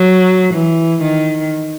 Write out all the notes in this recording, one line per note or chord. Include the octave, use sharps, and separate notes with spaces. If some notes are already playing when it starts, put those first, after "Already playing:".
Already playing: F#3
E3
D#3